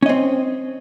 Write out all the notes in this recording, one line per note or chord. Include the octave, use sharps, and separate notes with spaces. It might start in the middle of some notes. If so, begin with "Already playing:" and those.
C4 C#4 D#5